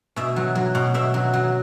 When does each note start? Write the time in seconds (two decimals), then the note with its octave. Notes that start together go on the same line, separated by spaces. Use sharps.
0.16 B2 E5
0.36 F#3
0.55 F#3
0.75 B2
0.94 B2 E5
1.14 F#3
1.34 F#3